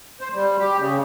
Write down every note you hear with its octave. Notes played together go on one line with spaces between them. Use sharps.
C5
G3
G4
C#3